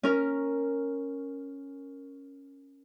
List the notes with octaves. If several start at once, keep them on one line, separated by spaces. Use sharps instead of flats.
C#4 A#4